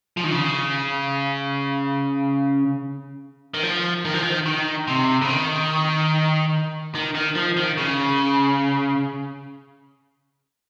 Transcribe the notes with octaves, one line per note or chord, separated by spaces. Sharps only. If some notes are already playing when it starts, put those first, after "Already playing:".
F3
D#3
C#3
D#3
F3
D#3
F3
D#3
D#3
C3
C#3
D#3
D#3
D#3
F3
D#3
C#3